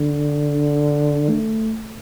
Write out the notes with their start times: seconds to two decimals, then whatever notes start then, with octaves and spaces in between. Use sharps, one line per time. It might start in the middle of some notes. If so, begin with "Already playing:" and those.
Already playing: D3
1.29 A3